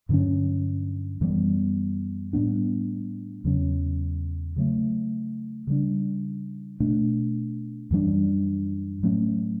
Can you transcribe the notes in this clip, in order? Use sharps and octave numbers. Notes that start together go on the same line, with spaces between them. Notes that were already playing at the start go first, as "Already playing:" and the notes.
G2 D3 F#3 C#4
F#2 E3 G3 B3
A2 G3 B3 D4
E2 C#3 F#3 C#4
C#3 F#3 A3
C#3 G3 D4
B2 A3 D4
F#2 E3 G3 D4
A2 F#3 A3 C#4